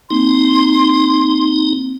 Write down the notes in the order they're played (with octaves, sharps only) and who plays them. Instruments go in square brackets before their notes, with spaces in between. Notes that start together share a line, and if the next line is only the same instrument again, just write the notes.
[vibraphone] A#3 C4 [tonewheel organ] D#4 [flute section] C6